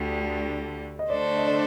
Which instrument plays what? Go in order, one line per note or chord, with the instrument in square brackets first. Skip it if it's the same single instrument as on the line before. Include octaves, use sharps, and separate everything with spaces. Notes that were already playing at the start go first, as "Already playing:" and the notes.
Already playing: [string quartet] D2 D3 G3
[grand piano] D#5
[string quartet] D3 A3 D4 A4 C5 [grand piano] D5
[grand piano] D#5
D5